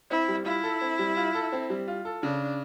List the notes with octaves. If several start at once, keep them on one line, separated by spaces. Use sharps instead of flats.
C4 E4
G3
E4 F4
A4
C4
G3
F4
A4
C4
G3
F4
A4
C#3 D4